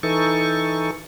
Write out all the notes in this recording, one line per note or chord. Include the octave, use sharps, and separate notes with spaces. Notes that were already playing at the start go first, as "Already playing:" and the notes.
E3 D#4 A4 C#6